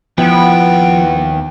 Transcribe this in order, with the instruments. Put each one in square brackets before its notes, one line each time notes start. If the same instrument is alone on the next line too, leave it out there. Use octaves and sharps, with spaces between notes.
[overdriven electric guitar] D#2 G5 [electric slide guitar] F3 E4 [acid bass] B3